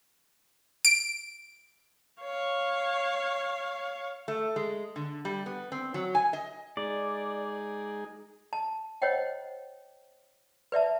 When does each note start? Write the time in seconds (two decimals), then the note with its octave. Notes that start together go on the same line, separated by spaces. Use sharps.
0.85 D7
2.22 C#5 F5
4.28 A3
4.56 G#3
4.96 D3
5.25 G3
5.46 B3
5.72 C4
5.94 F#3
6.15 G#5
6.33 D#5
6.77 G#3 D#4 G#4 D5
8.53 A5
9.02 C5 C#5 D#5 F#5 G5
10.72 B4 D5 E5 A5